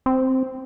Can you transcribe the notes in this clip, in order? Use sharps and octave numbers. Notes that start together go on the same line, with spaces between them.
C4